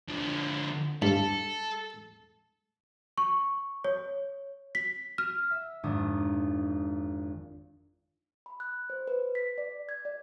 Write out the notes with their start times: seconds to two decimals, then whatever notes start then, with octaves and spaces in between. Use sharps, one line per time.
0.08 D3 F3
1.02 G2 A4
3.18 C#6
3.84 C#5
4.75 B6
5.18 F6
5.51 E5
5.83 G#1 F2 D4 D#6
8.46 B5
8.60 F#6
8.90 C5
9.07 B4
9.35 B6
9.58 D5
9.89 G#6
10.05 D5